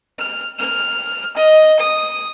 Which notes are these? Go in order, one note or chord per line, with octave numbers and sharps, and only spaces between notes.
F6
F6
D#5
D#6